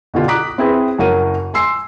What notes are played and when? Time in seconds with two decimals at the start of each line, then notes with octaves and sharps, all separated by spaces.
0.14 B2 D3 F4 G4
0.28 A#5 D6 D#6 F#6 B6 D7
0.58 C4 E4 G#4 B4
0.98 F#1 F#3 A#4 D#7
1.54 G#5 C6 E6 C7